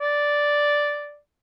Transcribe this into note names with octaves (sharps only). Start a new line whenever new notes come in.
D5